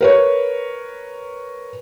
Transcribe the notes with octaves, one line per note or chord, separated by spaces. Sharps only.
A#4 B4 C#5